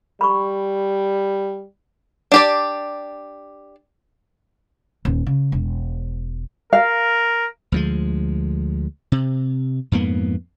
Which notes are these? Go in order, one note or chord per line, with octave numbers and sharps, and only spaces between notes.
G3 B5 C#6
D4 G4 D5
D#1
C#3
E1
A#4 F5
D2 F3 G#3
C3
F2 G#2 A#3 B3